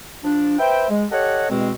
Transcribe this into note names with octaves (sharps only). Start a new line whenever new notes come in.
F3 D4
B4 C5 E5 G5
G#3
G4 A4 C#5 D#5 F#5
E2 G2 B2 G#3 C4